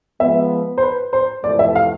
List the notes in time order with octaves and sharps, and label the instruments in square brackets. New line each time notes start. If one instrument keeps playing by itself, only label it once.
[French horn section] F3 G#3 B3 [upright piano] E5
[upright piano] C5
B4
C5
[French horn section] F2 C3 E3 A3 [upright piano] D5
[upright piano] E5
F5